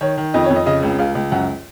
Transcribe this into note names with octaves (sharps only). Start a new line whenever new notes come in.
D#3 C#5
D#3
F2 D#5
C#5
F2
D#5
C#3 D#5
C#2
C#2 F5
C#2
F#2 F#5